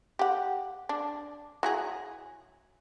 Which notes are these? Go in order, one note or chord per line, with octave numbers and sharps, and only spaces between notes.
G4 F#5
D4
F#3 E4 G#4